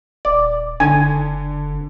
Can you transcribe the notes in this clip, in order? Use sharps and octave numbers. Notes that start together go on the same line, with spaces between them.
D#1 D5
F#1 D3 G#5